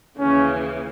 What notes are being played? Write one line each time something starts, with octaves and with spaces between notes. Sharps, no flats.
D#2 C#3 E3 C#4